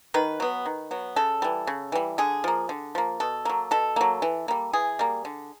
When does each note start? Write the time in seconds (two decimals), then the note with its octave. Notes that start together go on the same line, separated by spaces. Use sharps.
0.14 D#3 B4
0.40 F#3 B3
0.66 D#3
0.91 F#3 B3
1.16 C#3 A4
1.42 E3 G3
1.67 C#3
1.92 E3 G3
2.18 D3 G#4
2.44 F3 A#3
2.69 D3
2.95 F3 A#3
3.20 B2 A4
3.45 F#3 A#3
3.71 B2 A4
3.96 F#3 A#3
4.22 E3
4.48 G3 A#3
4.73 E3 G#4
4.99 G3 A#3
5.25 D3